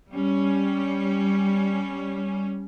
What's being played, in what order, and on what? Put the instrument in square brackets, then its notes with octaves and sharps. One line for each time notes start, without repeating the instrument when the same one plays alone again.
[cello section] G3 C#4